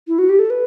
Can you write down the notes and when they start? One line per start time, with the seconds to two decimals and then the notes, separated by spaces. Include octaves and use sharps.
0.08 E4
0.18 F#4
0.29 G4
0.39 A4
0.50 B4